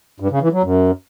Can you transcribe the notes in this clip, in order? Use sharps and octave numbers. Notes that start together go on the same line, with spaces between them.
G2
C#3
E3
F#3
F#2